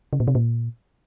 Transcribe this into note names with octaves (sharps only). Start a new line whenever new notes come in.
C#3
A#2
C3
A#2